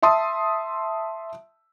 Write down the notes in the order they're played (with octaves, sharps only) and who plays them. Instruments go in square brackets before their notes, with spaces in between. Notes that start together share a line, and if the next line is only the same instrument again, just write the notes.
[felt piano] E5 A5 C6 D#6